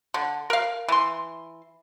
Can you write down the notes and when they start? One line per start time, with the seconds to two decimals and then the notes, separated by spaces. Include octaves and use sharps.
0.14 D3
0.50 A#4 F5
0.88 E3 C6